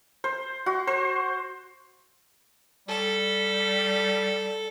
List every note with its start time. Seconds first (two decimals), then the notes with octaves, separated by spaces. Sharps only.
0.24 C5
0.66 F#4
0.87 C5
2.88 G3 A4